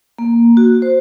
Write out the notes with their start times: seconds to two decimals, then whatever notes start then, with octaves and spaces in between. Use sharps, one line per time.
0.19 A#3
0.57 F#4
0.82 C5